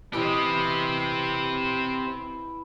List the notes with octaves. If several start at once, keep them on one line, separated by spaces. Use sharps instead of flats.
E3 C4 E4 G4 D#5